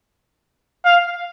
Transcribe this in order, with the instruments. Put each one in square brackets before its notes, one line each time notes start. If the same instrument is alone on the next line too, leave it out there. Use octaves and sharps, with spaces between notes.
[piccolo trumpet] F5